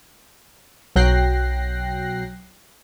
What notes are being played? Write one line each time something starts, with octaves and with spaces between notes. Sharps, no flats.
B1 F#3 G5 F#6 A#6 C7